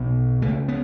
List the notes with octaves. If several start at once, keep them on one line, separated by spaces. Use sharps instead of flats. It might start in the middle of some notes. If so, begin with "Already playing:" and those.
Already playing: B1 B2
C#2 C#3 A3
B3